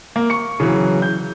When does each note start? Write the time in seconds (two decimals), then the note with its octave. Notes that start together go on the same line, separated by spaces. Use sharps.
0.16 A#3
0.30 C#6 C#7
0.60 C#3 E3 F#3
1.02 G6